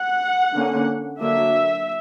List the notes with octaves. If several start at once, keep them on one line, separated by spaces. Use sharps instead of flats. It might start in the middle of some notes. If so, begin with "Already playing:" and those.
Already playing: F#5
D3 A#3 C#4
D3 F#3 A#3 D4 E5